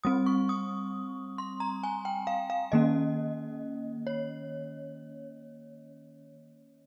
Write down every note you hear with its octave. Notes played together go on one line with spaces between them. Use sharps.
G3 C4 D#6
C#6
D#6
C6
A#5
G#5
G5
F5
F5
D#3 A#3 C#4 D#5
C#5